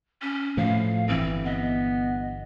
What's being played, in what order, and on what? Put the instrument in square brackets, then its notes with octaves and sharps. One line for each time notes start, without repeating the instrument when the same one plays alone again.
[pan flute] C#4
[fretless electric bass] A2 F3 A3 [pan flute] F5
[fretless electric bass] G1 E3 [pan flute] C4
[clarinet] B3 [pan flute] D#5